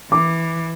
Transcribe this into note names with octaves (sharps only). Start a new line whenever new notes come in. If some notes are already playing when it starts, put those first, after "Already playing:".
E3 D6